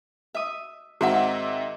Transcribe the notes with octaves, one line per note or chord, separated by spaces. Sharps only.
E5 D#6
G#2 D#3 C4 F#4 E5 F#5